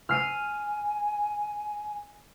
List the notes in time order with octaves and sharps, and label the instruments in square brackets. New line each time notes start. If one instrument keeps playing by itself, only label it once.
[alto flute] G#5 [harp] F6 C7 D#7